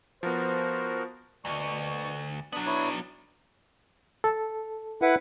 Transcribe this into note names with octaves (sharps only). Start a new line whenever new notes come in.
F3 B3 F#4 A#4 C5
D2 B2 D5 C#6
F#3 B3 D4
E4 B4 C#5
A4
E4 B4 F#5